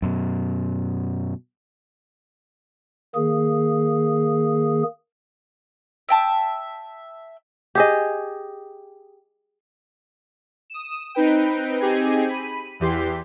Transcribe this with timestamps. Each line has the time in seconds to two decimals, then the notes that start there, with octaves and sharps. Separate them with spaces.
0.02 F#2 B2
3.15 D#3 A#3 G#4
6.09 E5 G5 A5
7.75 G4 G#4 D#5
10.70 D#6 E7
11.15 C4 D#4 B4 G5
11.81 C4 D#4 G4 G#4 G#5
12.29 B5 D#7
12.80 E2 E3 G4 C6 B6